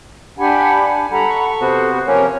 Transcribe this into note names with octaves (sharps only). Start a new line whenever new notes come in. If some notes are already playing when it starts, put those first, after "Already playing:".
D4 G4 F#5 G#5 B5
G3 A4 F#5 A#5 B5
C#6
C3 B3 F#4 C5
C3 F3 A#3 C#4 A#4 C#5